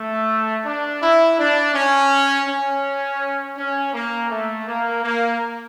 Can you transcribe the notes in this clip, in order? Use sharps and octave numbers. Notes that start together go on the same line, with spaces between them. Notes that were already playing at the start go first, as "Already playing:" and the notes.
Already playing: A3
D4
E4
D4
C#4
C#4
C#4
A#3
A3
A#3
A#3